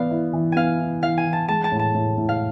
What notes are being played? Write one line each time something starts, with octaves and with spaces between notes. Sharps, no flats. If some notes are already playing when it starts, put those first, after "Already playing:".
Already playing: E3 B3 D5 F5
E4
E3
B3 F5 G#5
E4
E3 F5
G#5
E3
A5
G#3 A5
A5
A2
A5
A2
A2
F5